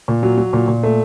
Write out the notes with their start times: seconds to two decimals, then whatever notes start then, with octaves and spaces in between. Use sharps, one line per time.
0.08 A#2
0.23 F#3
0.38 F#3
0.53 A#2
0.68 A#2
0.83 A3